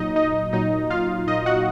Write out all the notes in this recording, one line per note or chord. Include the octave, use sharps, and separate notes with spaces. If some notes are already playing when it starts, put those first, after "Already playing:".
Already playing: A#2 F#3 D#4 D#5
D#4 D#5
A#2 F#3 D#4 D#5
F4 F5
A#2 F#3 D#4 D#5
F#4 F#5